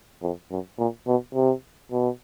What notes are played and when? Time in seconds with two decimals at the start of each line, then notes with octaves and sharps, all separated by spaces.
0.22 F2
0.51 F#2
0.79 A#2
1.07 B2
1.35 C3
1.92 B2